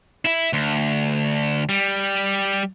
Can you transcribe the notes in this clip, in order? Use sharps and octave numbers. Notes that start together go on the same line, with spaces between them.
E4 E5
D2
G3